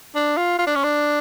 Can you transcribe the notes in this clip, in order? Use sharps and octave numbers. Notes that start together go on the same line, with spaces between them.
D4
F4
F4
D4
C#4
D4